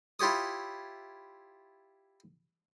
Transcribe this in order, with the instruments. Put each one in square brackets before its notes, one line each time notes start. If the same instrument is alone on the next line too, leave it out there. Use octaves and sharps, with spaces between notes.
[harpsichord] E4 F4 G4 C#5 D#6